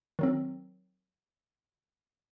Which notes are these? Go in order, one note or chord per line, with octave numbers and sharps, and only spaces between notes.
D#3 F#3 C4